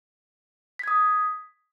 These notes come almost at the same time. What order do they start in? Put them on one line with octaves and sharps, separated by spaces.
B6 G#6 D#6